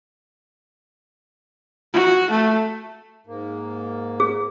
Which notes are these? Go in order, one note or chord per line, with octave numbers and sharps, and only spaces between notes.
F#4
A3
G#2 A#3
G#4